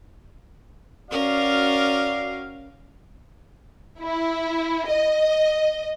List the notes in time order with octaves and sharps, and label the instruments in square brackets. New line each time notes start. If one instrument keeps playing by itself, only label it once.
[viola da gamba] C#4 A#4 [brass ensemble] F#4 F5 [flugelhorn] D5
[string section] E4
D#5